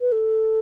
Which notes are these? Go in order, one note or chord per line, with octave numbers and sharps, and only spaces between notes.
B4
A4